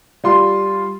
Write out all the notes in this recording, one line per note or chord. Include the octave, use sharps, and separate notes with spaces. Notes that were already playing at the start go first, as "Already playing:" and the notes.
G3 F4 C6